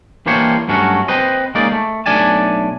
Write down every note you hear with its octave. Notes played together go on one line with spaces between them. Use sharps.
E3 G3 A#3 D4 C5 C#5
G2 F#3 A3 B3 C#4 F#4
C4 B4 C5 D#5
G#3 A#3 C#4 D#4 D5
A3
B1 A3 D4 D5 G#5 A5